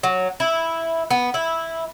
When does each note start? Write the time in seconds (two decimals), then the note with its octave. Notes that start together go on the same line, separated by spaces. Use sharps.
0.03 F#3
0.40 E4
1.10 B3
1.34 E4